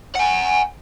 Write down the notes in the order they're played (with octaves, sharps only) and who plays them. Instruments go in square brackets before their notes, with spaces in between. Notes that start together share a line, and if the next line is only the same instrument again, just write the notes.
[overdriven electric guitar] F#5 G#5